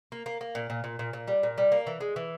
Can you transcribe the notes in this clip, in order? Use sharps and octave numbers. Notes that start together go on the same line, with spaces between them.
A#3
A#3
A#3
A#2
A#2
A#2
A#2
A#2
G3
A#2
G3
A#3
E3
G#3
E3